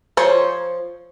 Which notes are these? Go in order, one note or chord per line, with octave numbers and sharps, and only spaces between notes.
F3 C5 C#5